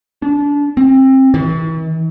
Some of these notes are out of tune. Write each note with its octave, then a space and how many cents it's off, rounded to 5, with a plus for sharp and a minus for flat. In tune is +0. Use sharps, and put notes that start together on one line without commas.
D4 -25
C4 +25
E3 -40